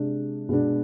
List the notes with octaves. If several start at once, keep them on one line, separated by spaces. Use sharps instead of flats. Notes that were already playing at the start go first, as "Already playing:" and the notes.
Already playing: C3 G#3 D4
B2 G#3 B3 D4